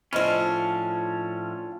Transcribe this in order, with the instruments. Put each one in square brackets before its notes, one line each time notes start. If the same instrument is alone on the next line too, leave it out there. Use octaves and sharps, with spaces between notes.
[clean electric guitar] A2 F3 C#4 [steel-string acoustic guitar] D4 F4 [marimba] C5 D#5 B5